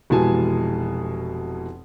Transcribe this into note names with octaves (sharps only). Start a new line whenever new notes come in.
F1 B2 E3 G#3 G#5 A5